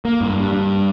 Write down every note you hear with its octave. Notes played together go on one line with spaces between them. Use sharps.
A#3
G2
G2
G2